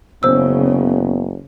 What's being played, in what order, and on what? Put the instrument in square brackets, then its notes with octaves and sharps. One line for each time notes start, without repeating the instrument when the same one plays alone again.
[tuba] F#1 [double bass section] C#3 [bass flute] B3 [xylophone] C5 E6